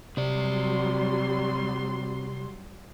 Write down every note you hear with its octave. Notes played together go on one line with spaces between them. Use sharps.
C3 F#3 G3 C4 D5 C6